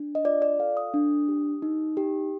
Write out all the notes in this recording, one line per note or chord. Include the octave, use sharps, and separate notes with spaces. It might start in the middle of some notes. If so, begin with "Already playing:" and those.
Already playing: D4
D#5
F4 D5
D5
A4 F5
D#6
D4
G4
D#4
G4